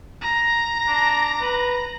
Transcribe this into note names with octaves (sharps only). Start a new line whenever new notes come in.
A#5
D4
B4